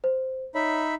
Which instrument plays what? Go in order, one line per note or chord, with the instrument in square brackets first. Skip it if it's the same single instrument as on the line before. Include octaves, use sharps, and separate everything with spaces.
[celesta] C5
[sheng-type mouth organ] D#4 E5 B5 [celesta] C#5